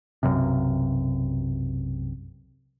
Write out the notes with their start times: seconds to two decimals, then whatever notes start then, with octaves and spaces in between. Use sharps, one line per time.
0.23 B1 F#2 C3